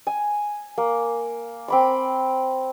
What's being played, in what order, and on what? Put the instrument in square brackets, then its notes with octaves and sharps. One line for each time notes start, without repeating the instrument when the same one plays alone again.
[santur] G#5
A#3
C4 B5 D6